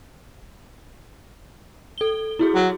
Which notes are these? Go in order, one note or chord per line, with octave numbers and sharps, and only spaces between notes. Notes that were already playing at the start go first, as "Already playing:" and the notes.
A4 G7
E4 F#4 G#4
F#3